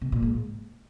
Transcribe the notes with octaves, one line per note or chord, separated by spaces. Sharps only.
C3
A#2
G#2